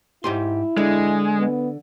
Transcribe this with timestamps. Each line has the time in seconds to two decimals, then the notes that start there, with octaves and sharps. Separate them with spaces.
0.24 G#2 E4 G4 C6
0.77 D3 G#3
1.38 B3